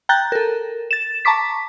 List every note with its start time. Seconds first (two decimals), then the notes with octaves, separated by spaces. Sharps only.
0.09 G5 A#5 F#6 G6 A6
0.32 A4 A#4
0.91 A6 E7
1.25 A5 A#5 C#6 D6 B6